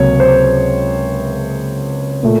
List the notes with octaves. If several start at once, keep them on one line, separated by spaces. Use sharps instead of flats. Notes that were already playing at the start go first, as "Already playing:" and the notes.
Already playing: C#2 C3 F#3 A#3 C#5
C5
A#2 A3